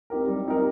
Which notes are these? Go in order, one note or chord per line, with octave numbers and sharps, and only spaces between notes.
C4 D#4 G4 A#4
G3
C4 D#4 G4 A#4